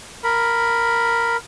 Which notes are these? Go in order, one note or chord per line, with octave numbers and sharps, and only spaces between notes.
A#4 B5